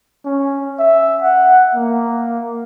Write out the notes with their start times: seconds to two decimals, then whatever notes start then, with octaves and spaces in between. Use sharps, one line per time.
0.25 C#4
0.79 E5
1.22 F#5
1.75 A#3